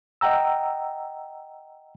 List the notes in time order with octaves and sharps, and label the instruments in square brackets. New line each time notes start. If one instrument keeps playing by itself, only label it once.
[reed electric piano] D#5 F#5 G5 A#5 E6